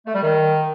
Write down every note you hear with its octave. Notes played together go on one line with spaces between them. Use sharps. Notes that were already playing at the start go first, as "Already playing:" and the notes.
A3
G3
D#3